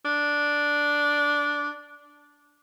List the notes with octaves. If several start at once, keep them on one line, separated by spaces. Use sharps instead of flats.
D4